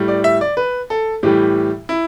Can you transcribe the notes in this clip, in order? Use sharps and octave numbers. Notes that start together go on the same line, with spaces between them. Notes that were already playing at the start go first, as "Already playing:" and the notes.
Already playing: A2 G3
D5
E5
D5
B4
A4
A2 E3 G3 G4
E4